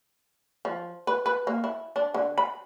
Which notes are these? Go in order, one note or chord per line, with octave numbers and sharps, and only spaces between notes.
F3
B4
B4
A#3
E4
D4
D3
B5